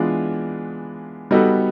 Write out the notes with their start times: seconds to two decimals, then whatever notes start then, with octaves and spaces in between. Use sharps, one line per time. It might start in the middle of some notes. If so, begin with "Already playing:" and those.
Already playing: E3 G#3 B3 D4 F4
1.31 G3 B3 D#4 F#4 A4